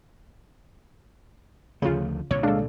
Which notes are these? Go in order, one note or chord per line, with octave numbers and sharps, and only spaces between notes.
D2 C#3 F3 A3 F4
C2 A#2 D3 C#5
G#3 D4 A4 F5